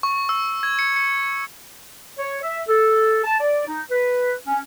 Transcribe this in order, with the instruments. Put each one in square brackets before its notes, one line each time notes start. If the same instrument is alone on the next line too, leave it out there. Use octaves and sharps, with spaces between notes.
[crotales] C#6
E6
G#6
C#7
C#7
[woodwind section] C#5
E5
A4
A5
D5
D#4
B4
C#4